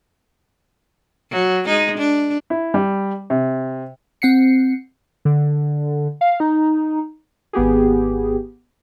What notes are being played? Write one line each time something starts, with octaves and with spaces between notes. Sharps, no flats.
F#3
G#3 D#4
D4
E4
G3
C3
C4 F#5 C7 C#7
D3
F5
D#4
G#1 B3 G4 G#4